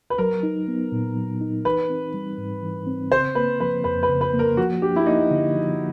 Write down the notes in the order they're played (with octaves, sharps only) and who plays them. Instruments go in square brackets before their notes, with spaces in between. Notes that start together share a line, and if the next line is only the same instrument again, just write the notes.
[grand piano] B4
[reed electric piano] F#3 [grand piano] A#4
[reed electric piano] D#4
B3
A#2
F#3
D#4
[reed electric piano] E3 [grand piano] B4
[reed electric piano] C4
G3
G#2
E3
C4
[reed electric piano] C#3 [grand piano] C5
[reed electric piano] A#3 [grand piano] B4
[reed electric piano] F3 [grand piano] B4
[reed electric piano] F2 [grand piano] B4
[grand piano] B4
[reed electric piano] C#3
[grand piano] B4
[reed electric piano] A#3
[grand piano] A#4
[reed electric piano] F3 [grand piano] F#4
[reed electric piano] D4 [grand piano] G4
[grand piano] E4
[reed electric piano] A#3 [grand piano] D#4
[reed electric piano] D3
F3